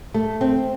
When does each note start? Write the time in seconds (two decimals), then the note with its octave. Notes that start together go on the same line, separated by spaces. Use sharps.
0.14 A3
0.41 C4